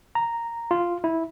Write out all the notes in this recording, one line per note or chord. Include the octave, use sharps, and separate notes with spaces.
A#5
F4
E4